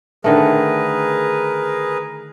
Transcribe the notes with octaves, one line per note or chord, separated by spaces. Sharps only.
D3 D#3 A3 G#4 A#4 B4